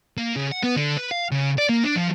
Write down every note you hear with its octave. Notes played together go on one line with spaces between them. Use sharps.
A#3
C#3
F#5
B3
D3
B4
F5
C#3
D5
A#3
D4
F3